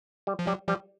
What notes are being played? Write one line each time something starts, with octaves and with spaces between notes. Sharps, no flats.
G3
F3
F#3 G3
F3 G3